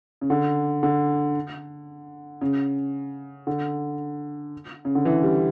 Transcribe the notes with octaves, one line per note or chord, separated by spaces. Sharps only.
C#3
D3
D3
C#3
D3
C#3
D3
E3
G3